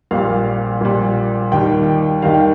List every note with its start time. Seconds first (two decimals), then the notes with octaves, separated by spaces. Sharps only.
0.11 A#1 A#2 G3 F5
0.81 A#1 A#2 G3
1.51 D#2 D#3 G3 G5
2.22 D#2 D#3 G3 F5
2.34 G5